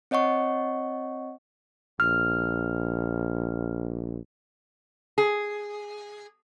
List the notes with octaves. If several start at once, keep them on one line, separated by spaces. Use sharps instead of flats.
C4 C#5 D#5 F#5 C#6
A#1 F6
G#4